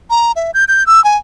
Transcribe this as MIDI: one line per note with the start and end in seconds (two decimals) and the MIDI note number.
0.10 0.32 82
0.36 0.51 76
0.54 0.65 91
0.68 0.86 91
0.86 1.03 88
1.04 1.16 80